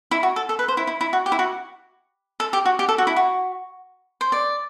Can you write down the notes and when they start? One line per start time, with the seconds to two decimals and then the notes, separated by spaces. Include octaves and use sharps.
0.11 E4
0.23 F#4
0.36 A4
0.49 A4
0.59 B4
0.68 C5
0.77 E4
0.87 E4
1.01 E4
1.13 F#4
1.26 G4
1.32 E4
1.39 F#4
2.40 A4
2.53 G4
2.66 F#4
2.79 G4
2.89 A4
2.98 F#4
3.07 E4
3.16 F#4
4.21 C5
4.32 D5